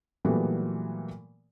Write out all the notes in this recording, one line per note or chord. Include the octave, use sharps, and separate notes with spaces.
A#2 E3 F#3 G3 A3 B3